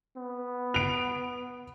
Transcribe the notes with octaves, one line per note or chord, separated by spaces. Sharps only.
B3
D7 F7